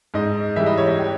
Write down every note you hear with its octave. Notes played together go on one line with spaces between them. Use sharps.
G#2 D#5
E3 G3 E5
D#5
C#5
D#5
G4